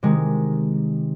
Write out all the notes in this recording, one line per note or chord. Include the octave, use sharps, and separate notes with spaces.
C3 D#3 G#3